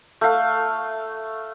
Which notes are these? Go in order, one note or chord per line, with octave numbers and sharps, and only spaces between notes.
A3 F5